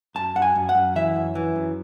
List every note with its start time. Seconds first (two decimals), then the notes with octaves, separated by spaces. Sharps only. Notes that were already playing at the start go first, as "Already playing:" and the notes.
0.15 F#2 A5
0.35 F#2 F#5
0.42 G#5
0.56 F#2
0.69 F#5
0.75 F#2
0.96 E3 E5
1.16 F#2
1.35 E3
1.56 F#2